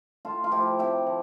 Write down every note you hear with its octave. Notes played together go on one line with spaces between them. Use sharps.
A2 F4 A4
F4
F3 E4 G4
C3 E4 G4
F3